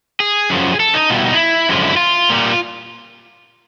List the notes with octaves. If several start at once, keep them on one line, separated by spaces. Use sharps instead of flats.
G#4
F#2 C#3 F3
A4
D#4
B2 G3 F4
E4
D#4
E4
F#2 D3 F3 G#3 F4
E4
F4
A#2 G3